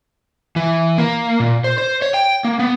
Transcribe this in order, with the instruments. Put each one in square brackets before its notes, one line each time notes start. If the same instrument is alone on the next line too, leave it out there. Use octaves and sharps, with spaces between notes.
[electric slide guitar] E3
A#3
A#2
C5
C5
C#5
G5
A#3
B3